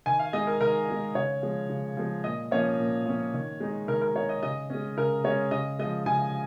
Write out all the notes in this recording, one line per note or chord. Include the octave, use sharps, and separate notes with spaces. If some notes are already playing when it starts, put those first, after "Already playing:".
D#3 G#5
F5
G#3 D#4 D#5
A#4
D#3 A#4
G#3 D#4
C#3 C#5
F3 G#3
C#3
F3 G#3
A#2 D#5
F3 A#3 C#4 C#5
A#2
F3 A#3 C#4
D#3
G#3 D#4
D#3 A#4
A#4
G#3 D#4 C#5
D#5
C#3 D#5
G#3 C#4
C#3 A#4
G#3 C#4 C#5
C#3 D#5
F3 G#3 D#5
C#3 G#5